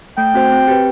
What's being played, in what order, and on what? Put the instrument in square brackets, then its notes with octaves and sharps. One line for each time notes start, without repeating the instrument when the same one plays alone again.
[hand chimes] A3 [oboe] G5
[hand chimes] C4 F#4 C5
C4
G4 B4